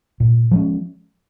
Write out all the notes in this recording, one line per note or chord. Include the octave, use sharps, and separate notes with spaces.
A#2
F3 G#3 C#4